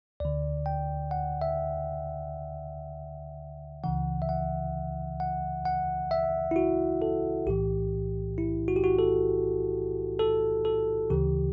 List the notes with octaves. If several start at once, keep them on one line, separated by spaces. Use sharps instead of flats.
D2 D3 D5
G5
F#5
E5
C#2 C#3 E3 F#5
E5
F#5
F#5
F#5
E5
E4
F#4
A4
B1 A2 E3 G4
E4
F#4
G4
F#4
A4
A4
A4
D2 C#3 E3 G4